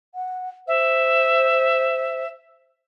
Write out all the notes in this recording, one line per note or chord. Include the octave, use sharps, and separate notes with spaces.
F#5
C5 E5